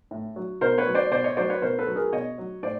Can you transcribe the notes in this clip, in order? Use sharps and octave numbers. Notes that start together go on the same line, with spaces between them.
A2
F#3
B2 A#4 C5
B4 C#5
F#3
C5 D5
B2 C5 D5
C#5 D#5
F#3 C5 D5
B4 C#5
B2 A#4 C5
A4 B4
F#3
G#4 A#4
B2 C#5 D#5
F#3
A2 C5 D5